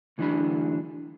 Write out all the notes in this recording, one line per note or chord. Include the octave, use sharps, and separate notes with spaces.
D2 E3 F#3 D4 G#4 B5